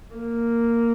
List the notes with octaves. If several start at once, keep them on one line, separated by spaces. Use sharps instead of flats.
A#3